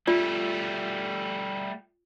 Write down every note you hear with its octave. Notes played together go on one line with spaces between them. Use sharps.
G3 A3 F4 D5